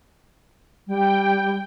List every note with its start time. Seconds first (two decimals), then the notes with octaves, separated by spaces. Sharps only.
0.87 G3 G5